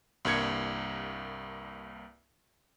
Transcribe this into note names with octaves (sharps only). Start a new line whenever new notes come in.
C2 G2 A#3 G#6 C#7